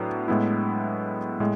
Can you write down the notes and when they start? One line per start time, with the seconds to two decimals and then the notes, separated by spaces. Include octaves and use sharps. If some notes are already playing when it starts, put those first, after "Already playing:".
Already playing: A2 F#3 B3 D4
0.28 A2 G#3 B3 E4
1.40 A2 G#3